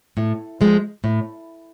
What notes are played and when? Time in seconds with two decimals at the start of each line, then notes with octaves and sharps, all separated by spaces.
0.17 A2
0.61 F3 G#3
1.04 A2